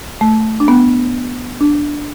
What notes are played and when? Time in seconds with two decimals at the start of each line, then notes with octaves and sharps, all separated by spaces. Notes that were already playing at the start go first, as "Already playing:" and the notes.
0.21 A3
0.60 D4
0.68 B3
1.61 D4